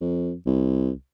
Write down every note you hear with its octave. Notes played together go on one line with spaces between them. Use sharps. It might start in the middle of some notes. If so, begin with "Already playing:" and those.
F2
C2